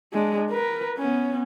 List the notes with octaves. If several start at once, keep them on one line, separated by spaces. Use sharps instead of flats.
G#3 D4
A#4 B4
B3 C#4